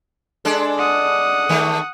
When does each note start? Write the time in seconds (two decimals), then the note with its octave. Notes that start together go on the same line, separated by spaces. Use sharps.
0.45 G#3 D4 A4
0.78 F#5 D#6
1.49 D#3 A3